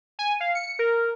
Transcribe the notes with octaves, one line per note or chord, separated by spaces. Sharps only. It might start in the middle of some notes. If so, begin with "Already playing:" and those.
G#5
F5
C#7
A#4